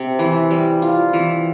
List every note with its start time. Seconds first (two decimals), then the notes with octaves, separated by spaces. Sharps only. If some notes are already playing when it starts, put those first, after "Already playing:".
Already playing: C3
0.19 E3
0.51 G3
0.82 F4
1.13 E3